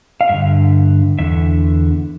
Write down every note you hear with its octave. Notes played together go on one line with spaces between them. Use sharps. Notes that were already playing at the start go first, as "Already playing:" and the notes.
F5
G2 D3 E5
E2 D3 E5